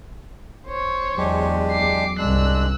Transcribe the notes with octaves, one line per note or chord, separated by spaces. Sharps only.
E1 C5 C#5
E2 F#3 G#3 D4 G4
D6 C7
C2 G2 G#3 D4 E6 F#6